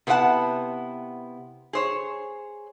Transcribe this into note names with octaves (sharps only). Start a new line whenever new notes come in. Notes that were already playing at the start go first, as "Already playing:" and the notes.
C3 B3 E4 F4 F#5 A5
G#4 C5 C#5